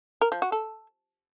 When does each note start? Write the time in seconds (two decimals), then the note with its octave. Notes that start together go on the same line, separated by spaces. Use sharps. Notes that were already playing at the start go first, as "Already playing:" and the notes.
0.21 A#4
0.32 F3
0.42 F#4
0.52 A4